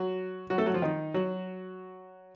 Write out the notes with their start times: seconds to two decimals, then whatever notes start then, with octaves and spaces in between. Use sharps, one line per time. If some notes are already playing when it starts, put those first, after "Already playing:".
Already playing: F#3 F#4
0.50 F#3 F#4
0.58 A3 A4
0.66 F#3 F#4
0.74 F3 F4
0.82 D#3 D#4
1.14 F#3 F#4